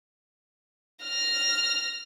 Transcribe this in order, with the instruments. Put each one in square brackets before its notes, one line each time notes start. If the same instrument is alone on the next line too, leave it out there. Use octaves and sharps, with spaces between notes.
[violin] F6 A#6